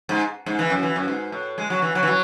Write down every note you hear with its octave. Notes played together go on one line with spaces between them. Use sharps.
G#2
G#2
E3
F#2
E3
F#2
G#2
A2
G#3
F#3
E3
F#3
E3
F#3